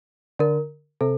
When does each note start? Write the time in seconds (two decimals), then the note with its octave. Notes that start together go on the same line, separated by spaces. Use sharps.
0.39 D3 A#4
1.01 C3 A4